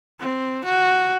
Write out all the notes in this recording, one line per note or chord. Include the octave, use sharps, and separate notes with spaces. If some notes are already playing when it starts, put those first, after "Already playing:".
C4
F#4